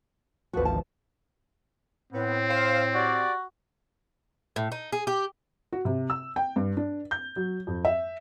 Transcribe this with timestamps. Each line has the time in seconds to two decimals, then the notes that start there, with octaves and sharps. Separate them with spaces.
0.53 G#1 D2 F3 F#4 B4
0.65 A5
2.13 A2 B3 C4
2.49 C5 F5
2.94 F#4 G4 D5
4.56 A2
4.72 D#4
4.92 G#4
5.07 G4
5.73 F#4
5.85 C3
6.10 E6
6.36 G5
6.56 G2
6.77 D4
7.11 G6
7.36 F#3
7.67 F2
7.85 E5